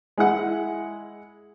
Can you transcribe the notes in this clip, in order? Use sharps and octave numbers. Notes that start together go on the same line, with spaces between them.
G#3 E4 F#5